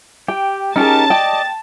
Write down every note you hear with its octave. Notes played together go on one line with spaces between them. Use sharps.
G4 G5
C#4 D#4 G4 G#4 A#4 A5
D5 D#5 G5